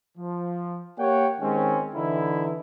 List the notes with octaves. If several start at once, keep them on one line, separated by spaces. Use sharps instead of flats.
F3
A#3 G4 C#5 F#5 G5
D#3 G#3 C4 C#4
D3 E3 D#4 E4